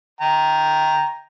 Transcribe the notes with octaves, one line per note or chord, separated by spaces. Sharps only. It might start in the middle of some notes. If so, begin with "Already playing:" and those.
G5 A#5